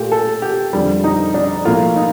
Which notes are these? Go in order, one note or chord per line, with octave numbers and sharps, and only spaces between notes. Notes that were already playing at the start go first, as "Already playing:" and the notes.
Already playing: A#2 A3 G4
A4
G4
F2 D3 G3
D#4
D4
A2 F3 A#3 F4
D#4